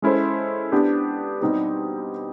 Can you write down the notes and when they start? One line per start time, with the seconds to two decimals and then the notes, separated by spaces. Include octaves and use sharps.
0.02 G#3 C#4 E4 A4 C5
0.72 B3 D4 G4
1.41 B2 G3 C4 D#4 G4